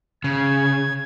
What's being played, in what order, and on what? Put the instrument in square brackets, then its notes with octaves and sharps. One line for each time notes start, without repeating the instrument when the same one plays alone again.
[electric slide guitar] C#3 [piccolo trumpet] G#6